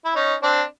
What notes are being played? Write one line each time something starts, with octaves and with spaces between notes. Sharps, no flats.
E4
C#4 D#4
C4 D4